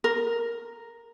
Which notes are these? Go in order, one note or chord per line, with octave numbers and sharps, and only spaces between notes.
A#4